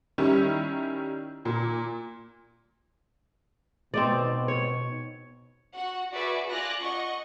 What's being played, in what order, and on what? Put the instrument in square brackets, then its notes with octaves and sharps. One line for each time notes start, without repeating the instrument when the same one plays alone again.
[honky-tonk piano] D#3 G3 C#4 E4
A#2
[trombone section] B2 [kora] C4 D#4 D5
[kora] C#5
[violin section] F#4 F#5
F#4 G#4 B4 D5 E5
F4 D5 G#5 F#6 A#6
D#5 F#5 C#6